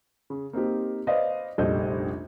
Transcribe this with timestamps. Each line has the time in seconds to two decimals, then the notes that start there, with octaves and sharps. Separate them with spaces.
0.30 C#3
0.53 A#3 C4 D#4 G4
1.07 B4 C5 D5 D#5 F5
1.58 F1 A#1 G3 A4 D#5 G6